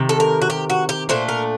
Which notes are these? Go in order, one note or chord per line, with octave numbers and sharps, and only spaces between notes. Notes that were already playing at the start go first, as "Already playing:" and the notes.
Already playing: C3 D#3
A4
A#4
F#4
G4
F#4
G4
A#2 A3 D4 C5
A#4